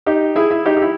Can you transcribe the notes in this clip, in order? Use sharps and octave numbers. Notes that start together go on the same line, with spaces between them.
D#4 G4
E4 G#4
E4
D#4 G4
G4
E4